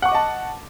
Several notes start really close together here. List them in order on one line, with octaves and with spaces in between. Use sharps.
F#5 C#6 D6 D#5 A5